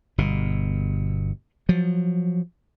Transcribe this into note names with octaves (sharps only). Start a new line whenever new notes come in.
G1 B2
F3 F#3